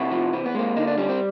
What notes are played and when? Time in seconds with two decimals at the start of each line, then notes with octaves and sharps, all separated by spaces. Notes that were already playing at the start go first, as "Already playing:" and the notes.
Already playing: C3 E4 F#4
0.12 F3
0.33 E3 C4
0.46 B3
0.55 G#3 A#3 C4
0.76 D3 D#4
0.87 D4
0.98 G3 C#4
1.09 C4